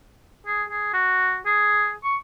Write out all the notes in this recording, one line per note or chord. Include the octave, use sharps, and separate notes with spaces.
G#4
G#4
F#4
G#4
C#6